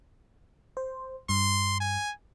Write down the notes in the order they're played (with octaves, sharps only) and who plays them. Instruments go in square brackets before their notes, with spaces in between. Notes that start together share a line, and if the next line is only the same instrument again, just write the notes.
[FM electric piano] C5
[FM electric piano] G2 [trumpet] C6
[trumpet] G#5